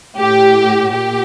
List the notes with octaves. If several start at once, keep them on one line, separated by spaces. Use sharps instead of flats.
A2 G4
A#2 G4